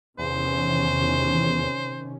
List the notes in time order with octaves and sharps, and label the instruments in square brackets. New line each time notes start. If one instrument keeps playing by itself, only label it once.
[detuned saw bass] E2 [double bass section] C3 D#3 C#4 [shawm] C5